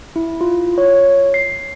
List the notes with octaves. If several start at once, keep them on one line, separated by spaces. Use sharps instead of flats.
E4
F4
C#5
C7